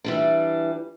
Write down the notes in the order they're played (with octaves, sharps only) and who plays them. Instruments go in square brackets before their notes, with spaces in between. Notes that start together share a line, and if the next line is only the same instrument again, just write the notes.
[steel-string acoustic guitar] E3 G3 D4